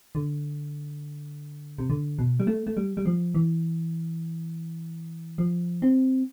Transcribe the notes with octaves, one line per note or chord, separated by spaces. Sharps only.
D3
C3
D3
B2
G3
A3
A3
G3
G3
F3
E3
F3
C4